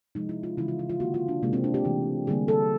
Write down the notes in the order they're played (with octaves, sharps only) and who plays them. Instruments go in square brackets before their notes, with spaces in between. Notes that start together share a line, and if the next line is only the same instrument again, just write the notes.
[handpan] C3 F3 G#3 D#4
E4
F4
C#3 E3 G#3 E4
F4
E4
F4
D3 F3 A#3 F#4
F4
D4
C3 E3 G#3 A#3
C4
D4
G4
C3 E3 A3
D3 G3 A#3 G#4
A4